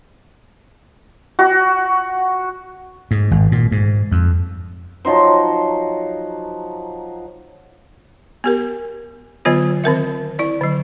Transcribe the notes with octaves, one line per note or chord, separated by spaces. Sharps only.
F#4
G#2
G#1
A#2
G#2
F2
F3 F#3 D#4 C5
B3 G4 A#4
D3 F#3 B3 F4 C#5
D#3 C4 A#4 E5
E4 D5
D3 F#3